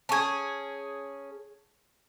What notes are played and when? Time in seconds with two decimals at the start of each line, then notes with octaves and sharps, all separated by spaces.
0.09 C#4 G#4 A5 C#6 G#6